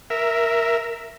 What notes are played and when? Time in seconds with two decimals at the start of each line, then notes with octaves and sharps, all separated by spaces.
0.10 A#4 E5